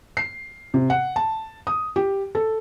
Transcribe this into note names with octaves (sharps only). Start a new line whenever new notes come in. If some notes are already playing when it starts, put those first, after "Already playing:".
C7
C3
F#5
A5
D#6
G4
A4